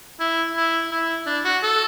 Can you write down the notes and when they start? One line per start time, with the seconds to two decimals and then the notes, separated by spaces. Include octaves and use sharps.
0.20 E4
0.56 E4
0.91 E4
1.26 D4
1.44 F#4
1.63 A4